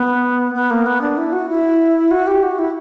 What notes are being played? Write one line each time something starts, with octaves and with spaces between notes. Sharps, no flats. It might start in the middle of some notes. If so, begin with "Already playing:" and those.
Already playing: B3
B3
A#3
B3
D4
E4
F#4
E4
F#4
G4
F#4
E4